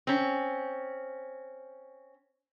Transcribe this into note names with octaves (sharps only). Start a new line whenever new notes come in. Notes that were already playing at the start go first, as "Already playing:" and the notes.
C4 C#4